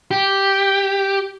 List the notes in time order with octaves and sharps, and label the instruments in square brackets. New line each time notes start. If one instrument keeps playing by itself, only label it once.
[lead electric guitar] G4